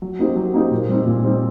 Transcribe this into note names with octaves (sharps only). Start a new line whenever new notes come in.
F#3
A#3 D#4 G4 C5
F#3
A#3 D#4 G4 C5
A#2
G3 C4 D#4
A#2
G3 C4 D#4